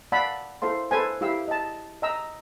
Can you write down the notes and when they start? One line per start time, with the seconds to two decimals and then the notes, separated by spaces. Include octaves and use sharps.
0.12 D5 F5 F#5 A5 B5 E6
0.62 E4 A4 C5 F5 C6
0.91 A4 B4 C5 G#5
1.21 E4 G4 F5 E6
1.48 D#5 A5
2.02 D#5 G5 A#5 E6